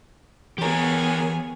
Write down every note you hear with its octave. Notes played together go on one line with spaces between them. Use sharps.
E3 B3 G4 G#4 A#4 C#5